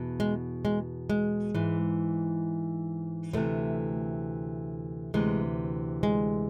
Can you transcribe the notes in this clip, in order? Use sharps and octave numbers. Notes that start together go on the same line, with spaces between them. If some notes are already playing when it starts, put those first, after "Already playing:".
Already playing: E2 B2
G#3
G#3
G#3
G#2 E3
D2 C3 E3 F3 A3
D2 C3 E3 G#3
G#3